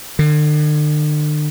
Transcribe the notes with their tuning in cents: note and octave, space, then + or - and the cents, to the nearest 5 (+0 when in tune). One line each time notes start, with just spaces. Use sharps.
D3 +45